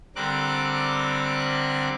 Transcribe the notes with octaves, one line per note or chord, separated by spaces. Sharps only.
D3 G3 C4 A#4 D6 F#6